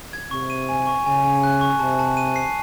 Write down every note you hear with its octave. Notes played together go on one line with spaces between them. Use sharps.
G#6
C3 C#6
D#7
G#5
C#6
C#3 G#5
G#5
F#6
C#6
C3 A5
A5
D#7
C7